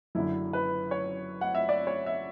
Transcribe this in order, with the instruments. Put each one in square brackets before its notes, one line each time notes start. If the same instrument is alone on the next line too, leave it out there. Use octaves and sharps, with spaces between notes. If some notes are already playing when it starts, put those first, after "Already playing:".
[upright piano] F#1 F#2 D3 E4
B4
C#5
F#5
E5
D5
C#5
E5